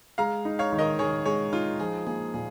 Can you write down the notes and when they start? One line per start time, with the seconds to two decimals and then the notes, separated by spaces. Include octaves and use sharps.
0.18 G#3 F5 A#5
0.45 D#4
0.59 C#5 F5
0.72 D#3
0.79 A#4 D#5
0.99 D#3 G#4 C#5
1.26 G#3 G#4 C#5
1.52 D#4 F4
1.79 F3 G#4
2.07 A#3 G#4
2.34 A#2 G#4